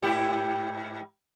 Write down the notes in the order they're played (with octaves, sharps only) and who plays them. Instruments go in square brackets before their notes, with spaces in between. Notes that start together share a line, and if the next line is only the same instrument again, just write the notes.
[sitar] G#2 E4 G4